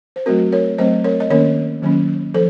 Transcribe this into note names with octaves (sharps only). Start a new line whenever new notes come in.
C5
F#3 A3 C4 F#4 A#4
A#4 C#5
F#3 A3 C4 C5 D#5
A#4 C#5
D#5
D#3 A#3 C#4 A#4 C#5
D#3 F#3 A#3 C#4
F3 A4 C5